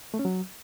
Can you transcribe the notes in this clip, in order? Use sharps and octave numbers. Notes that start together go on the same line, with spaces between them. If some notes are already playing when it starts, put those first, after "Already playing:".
A3
C#4
F#3